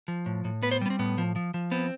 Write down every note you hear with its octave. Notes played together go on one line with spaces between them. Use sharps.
F3
A2
A2
B3 B4
C5
G3 B3
C4
A2 B3
F3
F3
F3
B3 C4